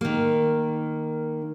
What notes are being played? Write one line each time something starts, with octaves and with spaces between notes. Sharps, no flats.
D#3 A#3